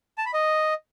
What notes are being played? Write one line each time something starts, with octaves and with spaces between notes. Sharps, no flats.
A5
B5
D#5